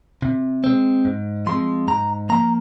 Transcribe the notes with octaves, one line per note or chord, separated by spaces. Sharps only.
C3
G#3 C4
G#2
F3 G#3 C4 C6
G#2 A#5
F3 A#3 A#5